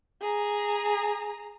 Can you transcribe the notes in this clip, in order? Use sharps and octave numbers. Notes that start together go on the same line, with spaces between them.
G#4 A#5